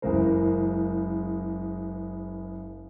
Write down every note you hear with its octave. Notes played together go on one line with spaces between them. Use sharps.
F#1 C#3 E3 G#3 A#4 C5